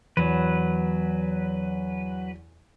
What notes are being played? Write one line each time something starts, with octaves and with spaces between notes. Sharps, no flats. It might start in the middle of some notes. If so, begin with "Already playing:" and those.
E2 F#3 B4